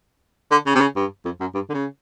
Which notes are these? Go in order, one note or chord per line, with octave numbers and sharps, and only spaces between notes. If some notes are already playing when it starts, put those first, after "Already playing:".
D3
C#3
C3
C#3
G2
F2
F#2
G2
D3
C#3